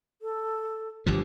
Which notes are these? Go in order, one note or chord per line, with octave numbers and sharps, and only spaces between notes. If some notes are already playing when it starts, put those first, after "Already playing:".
A4
G1 D3 F3 G4